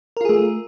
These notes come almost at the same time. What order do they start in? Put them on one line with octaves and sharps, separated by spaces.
A#4 F4 G#4 A3